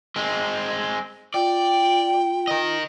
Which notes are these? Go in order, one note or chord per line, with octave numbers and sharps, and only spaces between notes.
G#3 C4
F4 D5 G5
A#4 D#5